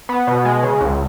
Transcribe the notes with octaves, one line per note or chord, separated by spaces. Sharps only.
B3
B2
G#3
C#3
C#2